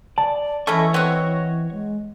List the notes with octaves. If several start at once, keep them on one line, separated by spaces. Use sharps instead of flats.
D5 A5
E3 A3 C#4 E4 D#5 C#6
B3 C4 F#4 C#5 D#5 C#6
G#3